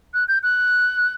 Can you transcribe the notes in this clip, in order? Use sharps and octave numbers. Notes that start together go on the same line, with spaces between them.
F#6
G6
F#6